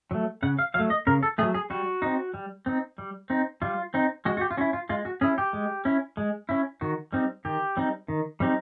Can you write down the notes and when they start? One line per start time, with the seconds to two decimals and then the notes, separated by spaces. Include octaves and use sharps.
0.11 F#3 A3
0.43 C#3 F#5
0.59 F5
0.74 F#3 A3 F5
0.90 D#5
1.07 C#3 A#4
1.23 A4
1.38 A3 G#4
1.42 F#3
1.54 G#4
1.70 G3 F#4
2.02 C4 D#4
2.34 G3
2.66 C4 D#4
2.98 G3
3.30 C4 D#4
3.62 G3 F4
3.94 C4 D#4
4.25 G#3 F#4
4.37 F#4
4.41 G4
4.51 F4
4.57 C#4 F#4
4.61 E4
4.73 F4
4.89 G#3 F4
5.05 F#4
5.21 C#4 E4 G#4
5.38 G4
5.53 G#3
5.85 C#4 E4
6.17 G#3
6.49 C#4 E4
6.81 D#3 F#4
7.13 G3 C4 D#4
7.45 D#3 G4
7.77 G3 C4 D#4
8.08 D#3
8.40 G3 C4 D#4